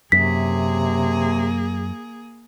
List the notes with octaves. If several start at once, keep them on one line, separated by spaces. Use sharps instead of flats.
F#2 C3 A#3 G#4 B6